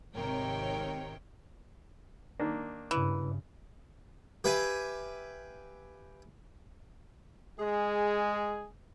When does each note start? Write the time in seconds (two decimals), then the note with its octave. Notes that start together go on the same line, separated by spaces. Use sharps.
0.14 G#1 C3 D#3 A#4 C#5 G5
2.40 D#3 A#3 D4
2.91 G2 C#3 E3
4.44 G4 B4 E5 F5 G#5
7.58 G#3 G#4